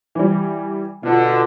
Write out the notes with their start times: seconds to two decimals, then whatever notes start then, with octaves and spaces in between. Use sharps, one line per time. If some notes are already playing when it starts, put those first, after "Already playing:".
0.15 E3 G3
1.03 B2 D3 F4